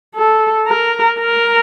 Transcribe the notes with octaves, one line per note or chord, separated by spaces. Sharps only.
A4
A#4
A#4